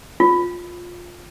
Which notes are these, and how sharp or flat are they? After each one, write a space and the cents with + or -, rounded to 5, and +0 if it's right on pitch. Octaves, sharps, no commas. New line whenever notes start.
F4 +10